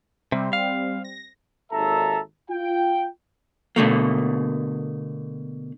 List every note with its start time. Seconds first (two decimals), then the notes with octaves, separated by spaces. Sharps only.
0.32 C3 G3 C4
0.53 F5
1.04 A#6
1.71 G#1 D#2 A4 E5 A#5
2.49 F4 G5
3.76 B2 D3 A3 A#3